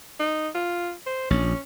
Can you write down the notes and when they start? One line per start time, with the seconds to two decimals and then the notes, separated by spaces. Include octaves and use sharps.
0.20 D#4
0.55 F4
1.06 C5
1.30 A#1 C#4